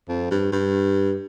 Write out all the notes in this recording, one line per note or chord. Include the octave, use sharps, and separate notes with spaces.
F2
G2
G2